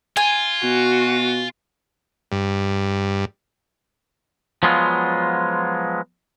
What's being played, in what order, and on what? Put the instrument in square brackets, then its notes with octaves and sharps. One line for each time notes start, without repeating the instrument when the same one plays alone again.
[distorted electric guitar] F4 [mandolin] G#5
[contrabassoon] B2 [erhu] F#4
[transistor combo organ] G2
[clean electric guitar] F3 F#3 G#3 B3 F4